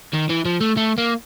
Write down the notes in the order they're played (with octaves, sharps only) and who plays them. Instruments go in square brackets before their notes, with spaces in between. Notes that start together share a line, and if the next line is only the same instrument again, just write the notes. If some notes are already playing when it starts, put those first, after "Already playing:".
[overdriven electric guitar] D#3
E3
F3
A3
A3
A#3